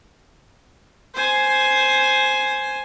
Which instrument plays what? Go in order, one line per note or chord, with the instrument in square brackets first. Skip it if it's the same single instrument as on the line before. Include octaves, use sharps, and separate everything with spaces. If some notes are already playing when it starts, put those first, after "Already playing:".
[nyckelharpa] C5 G#5